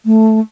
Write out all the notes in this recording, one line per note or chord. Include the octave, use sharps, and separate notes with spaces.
A3